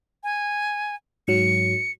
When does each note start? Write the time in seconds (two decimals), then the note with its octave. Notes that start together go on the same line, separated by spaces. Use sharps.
0.23 G#5
1.28 G#2 F#3 C#7